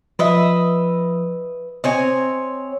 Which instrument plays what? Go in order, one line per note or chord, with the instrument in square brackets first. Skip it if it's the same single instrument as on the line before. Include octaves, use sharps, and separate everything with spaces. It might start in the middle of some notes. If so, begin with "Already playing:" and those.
[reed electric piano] F3 [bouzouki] B4 D#5 E5
[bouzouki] C4 C#5 G#5 [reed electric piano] D#5